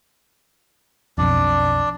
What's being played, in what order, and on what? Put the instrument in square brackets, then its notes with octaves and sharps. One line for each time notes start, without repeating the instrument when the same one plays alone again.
[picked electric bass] B1 F2 [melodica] D4 D5